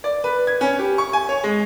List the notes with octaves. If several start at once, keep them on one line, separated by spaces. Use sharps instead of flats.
D5
B4
G#6
C#4
G4
C#6
G#5
C#5
G#3